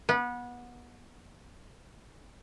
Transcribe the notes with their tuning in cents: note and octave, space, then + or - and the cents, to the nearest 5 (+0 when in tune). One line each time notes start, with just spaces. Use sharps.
B3 -25